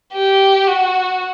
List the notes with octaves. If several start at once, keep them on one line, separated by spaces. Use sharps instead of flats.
G4
F#4